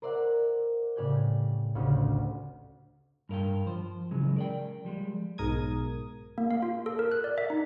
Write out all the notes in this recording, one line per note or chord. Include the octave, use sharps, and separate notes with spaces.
A#4 C5 D5 E5 F#5
A2 C#3 G4 D5 G#5 G6
A1 D2 C#3 C4 C#4
G2 A#4 F5 G5
F3 C5
C#3 E3 F#3 G#3
A#4 D5 G5
F3 G3 G#3
B1 G#2 A#4 D#6 G#6
A#3
F5
F4
A4
A#4
F#6
D5
E5
D#4